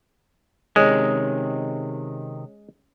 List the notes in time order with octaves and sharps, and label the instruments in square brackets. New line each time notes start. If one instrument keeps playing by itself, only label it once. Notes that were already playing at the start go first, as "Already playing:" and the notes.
[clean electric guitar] C3 D#3 [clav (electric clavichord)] G#3 [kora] C#4